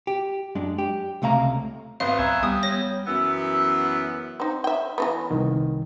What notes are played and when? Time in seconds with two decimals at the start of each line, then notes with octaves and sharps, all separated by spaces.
0.07 G4
0.55 F#2 G#3 D4
0.78 G4
1.22 C#2 C3 A3 F5 A#5
2.00 G#1 B3 C4 F5
2.19 C2 E5 G#5 A#5 F#6
2.43 G3 B3 D#6
2.63 C#5 A#6
3.07 F#2 E3 B3 E6
4.40 C4 D#4
4.64 E5 G5
4.98 E3 A3 B3
5.31 C2 D#3